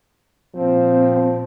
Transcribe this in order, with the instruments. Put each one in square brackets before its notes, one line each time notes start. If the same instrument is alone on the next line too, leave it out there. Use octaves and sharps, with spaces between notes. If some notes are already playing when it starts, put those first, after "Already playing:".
[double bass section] A#2 C4 [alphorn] F3